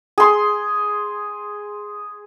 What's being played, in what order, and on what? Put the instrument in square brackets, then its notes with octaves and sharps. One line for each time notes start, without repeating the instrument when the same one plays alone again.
[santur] G#4 C6